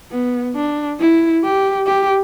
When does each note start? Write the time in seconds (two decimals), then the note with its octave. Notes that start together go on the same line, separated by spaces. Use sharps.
0.11 B3
0.55 D4
1.00 E4
1.43 G4
1.87 G4